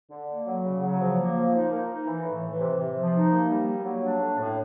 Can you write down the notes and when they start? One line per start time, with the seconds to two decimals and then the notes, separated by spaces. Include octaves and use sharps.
0.11 D3
0.29 A#3
0.47 F#3
0.65 C#3
0.82 F#3
1.00 F3
1.18 A#3
1.36 F3
1.54 D#4
1.72 A#3
1.89 D#4
2.07 E3
2.25 A2
2.43 E3
2.60 C3
2.78 C3
2.96 F3
3.14 D#4
3.32 A#3
3.49 G3
3.68 A#3
3.85 F#3
4.03 D4
4.21 A2
4.38 A2